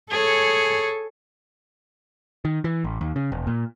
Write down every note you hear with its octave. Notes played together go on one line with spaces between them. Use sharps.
G#4 A4 C#5
D#3
E3
A1
D#2
C#3
E1
A#2